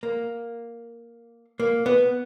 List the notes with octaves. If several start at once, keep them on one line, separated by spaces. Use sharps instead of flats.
A#3
A#3
B3